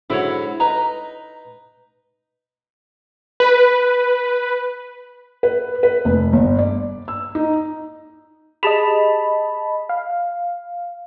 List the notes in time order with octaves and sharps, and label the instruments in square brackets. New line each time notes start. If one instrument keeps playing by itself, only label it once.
[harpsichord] G#2 D3 F#3 [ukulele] E4 C#5
[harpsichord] D#4 B4 [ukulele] A#5
[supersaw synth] B4
[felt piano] B4
B4
F1
G1
D5
E6
D#4
[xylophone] G4 G#4 [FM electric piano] D#5 A5 B5
[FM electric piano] F5